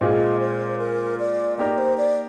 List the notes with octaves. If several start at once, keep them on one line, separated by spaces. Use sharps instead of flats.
A#2 G#3 C4 F4 G#4 D#5
C5
A#4
D5
A#3 D#4 G4 A#4 D5
C5
D5